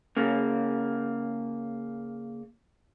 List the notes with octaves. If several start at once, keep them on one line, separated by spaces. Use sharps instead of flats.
C#3 A#3